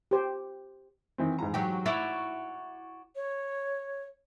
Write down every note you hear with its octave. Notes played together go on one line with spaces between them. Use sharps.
G4 C5
D#3 E3 C4
G#2 E3 A#5
F#3 G4
E4 F#4 C#5 D5
C#5